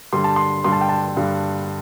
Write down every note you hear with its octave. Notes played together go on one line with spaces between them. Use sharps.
G2 D3 G3 C6
A5
C6
G2 D3 G3 C6
A5
G5
A5
G2 D3 G3